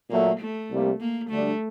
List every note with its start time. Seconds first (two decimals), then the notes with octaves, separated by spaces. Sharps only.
0.10 A#2 F#3 A3 A#3
0.40 A3
0.70 C2 C3 G3 A#3
1.00 A#3
1.30 D2 D3 G3 A3 D4